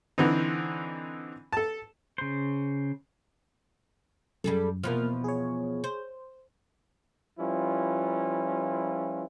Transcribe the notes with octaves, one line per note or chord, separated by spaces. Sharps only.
D3 E3 C4 D#4
A4 A5
C#3 C5
F#2 G3 G#4 A4
E2 B2 F3 A#3 F6
G#4 C#5
C5
F3 G3 C#4 E4 F4 B4